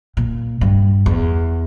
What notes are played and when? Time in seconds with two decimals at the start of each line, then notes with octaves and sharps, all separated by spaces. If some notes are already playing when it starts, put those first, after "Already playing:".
0.17 A#2
0.61 G2
1.06 E2